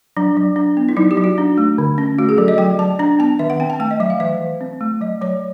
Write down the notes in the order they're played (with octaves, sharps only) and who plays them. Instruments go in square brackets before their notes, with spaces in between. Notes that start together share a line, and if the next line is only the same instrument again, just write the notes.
[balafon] F#3 D4
F#3
D4
B3
E4
F#3 D#4
G4
F#3
F#4
D4
A3
D3
C#4
A3 F#4
G#4
F#3 A4
D#5
F#3 G5
F#3 A5
D4 A#5
B3 A5
D#3 E5
F#5
C4 G5
A5
A3 G5
D#5
F#3 E5
F5
E3 E5
E3
C4
A3
F#3 D#5
F#3 C#5